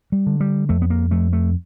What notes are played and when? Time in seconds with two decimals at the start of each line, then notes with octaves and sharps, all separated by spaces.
0.12 G3
0.27 D3
0.40 G3
0.69 F2 A3
0.82 B3
0.90 A#3
1.11 F2 A3
1.33 A3